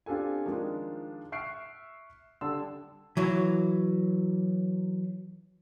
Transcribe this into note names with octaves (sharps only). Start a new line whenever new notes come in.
C4 D4 F4 G4 A4 G#5
D#3 F3 G#3 D4 F4
E5 C#6 F6 F#6 C7 D7
D3 G3 A5 C6 E6
E3 F#3